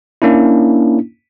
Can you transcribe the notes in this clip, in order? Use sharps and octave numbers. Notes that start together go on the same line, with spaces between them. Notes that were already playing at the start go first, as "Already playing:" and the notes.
A#3 C#4 D4 E4